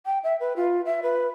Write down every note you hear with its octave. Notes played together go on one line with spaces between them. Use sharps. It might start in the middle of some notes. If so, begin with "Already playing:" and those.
G5
E5
B4
F4
E5
B4